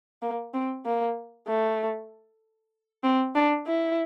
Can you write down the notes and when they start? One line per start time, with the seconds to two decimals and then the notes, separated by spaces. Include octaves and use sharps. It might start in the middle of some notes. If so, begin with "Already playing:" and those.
0.22 A#3
0.54 C4
0.85 A#3
1.48 A3
3.04 C4
3.35 D4
3.67 E4